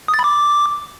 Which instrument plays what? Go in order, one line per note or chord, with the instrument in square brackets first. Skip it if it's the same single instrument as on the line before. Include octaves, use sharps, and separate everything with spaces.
[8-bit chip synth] D#6
A6
B5
D6